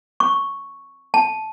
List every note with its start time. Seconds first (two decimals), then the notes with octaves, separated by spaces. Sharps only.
0.20 C#6
1.14 A5